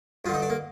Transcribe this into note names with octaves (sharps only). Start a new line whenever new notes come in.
G2 D3 D#4 F4
D4
A#3